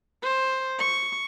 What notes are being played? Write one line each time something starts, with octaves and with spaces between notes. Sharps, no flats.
C5
C#6